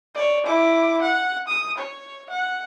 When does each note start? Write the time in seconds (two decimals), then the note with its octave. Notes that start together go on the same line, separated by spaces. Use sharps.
0.15 C#5 D5
0.46 E4 D6
1.02 F#5
1.48 D#6
1.78 C#5
2.30 F#5